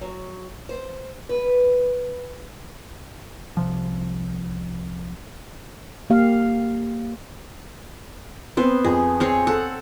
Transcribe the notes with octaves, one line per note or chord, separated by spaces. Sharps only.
F#3
C5
B4
C2 C3 F3
A#3 G4 F5
B3 C4 C5
F2 G#4
C4 G#4 C#5
A4 F#5